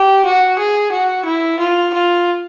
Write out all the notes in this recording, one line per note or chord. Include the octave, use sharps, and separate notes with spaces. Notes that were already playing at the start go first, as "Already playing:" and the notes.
Already playing: G4
F#4
G#4
F#4
E4
F4
F4